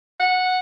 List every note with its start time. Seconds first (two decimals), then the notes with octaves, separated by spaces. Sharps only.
0.20 F#5